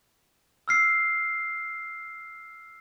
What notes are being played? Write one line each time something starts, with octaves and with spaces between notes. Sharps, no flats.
E6 F6 C7